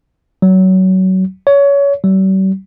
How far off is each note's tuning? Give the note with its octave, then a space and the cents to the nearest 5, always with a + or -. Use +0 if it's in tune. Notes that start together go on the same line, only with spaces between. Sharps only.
F#3 +20
C#5 +25
G3 -45